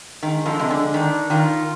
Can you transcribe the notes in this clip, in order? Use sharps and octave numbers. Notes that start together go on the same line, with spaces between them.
D#3 G#3
D3 F3
C3 G#3
D3
D#3 D4
D#3 F4